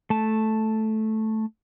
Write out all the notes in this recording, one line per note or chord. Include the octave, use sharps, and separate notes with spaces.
A3 A5